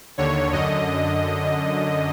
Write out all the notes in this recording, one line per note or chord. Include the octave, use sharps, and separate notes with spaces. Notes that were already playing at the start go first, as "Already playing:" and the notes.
D#2 D3 C#5
F#2 D3 D#5